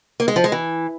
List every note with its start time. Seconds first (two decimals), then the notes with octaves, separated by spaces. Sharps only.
0.20 A#3
0.28 G#3
0.36 F3
0.44 G#3
0.52 E3